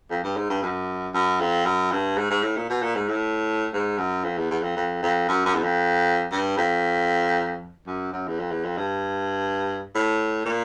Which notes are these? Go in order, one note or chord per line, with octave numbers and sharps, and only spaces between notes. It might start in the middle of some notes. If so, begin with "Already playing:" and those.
F2
G2
G#2
G2
F#2
F#2
F2
F#2
G2
G#2
G#2
A2
A#2
B2
A#2
G#2
A2
G#2
F#2
F2
E2
E2
F2
F2
F2
F#2
F#2
E2
F2
G2
F2
F#2
F#2
E2
F2
E2
F2
G2
A2
A#2